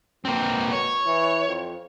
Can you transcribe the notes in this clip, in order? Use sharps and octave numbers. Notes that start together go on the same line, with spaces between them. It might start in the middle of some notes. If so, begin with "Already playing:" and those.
B2 A#3 C4
C#5
E3
F2